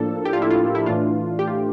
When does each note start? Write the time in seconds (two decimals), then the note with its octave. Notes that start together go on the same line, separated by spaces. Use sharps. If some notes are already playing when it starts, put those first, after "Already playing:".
Already playing: A2 F3 A#3 D4 A4
0.25 G4
0.33 F4
0.42 E4
0.51 F4
0.75 E4
0.86 A2 E3 A3 D4 F4
1.39 G4
1.47 F4